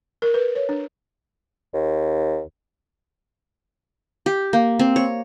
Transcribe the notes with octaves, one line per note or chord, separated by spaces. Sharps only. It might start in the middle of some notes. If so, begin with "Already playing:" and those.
A#4
B4
C#5
D4
D#2
G4
A#3
C4
C#5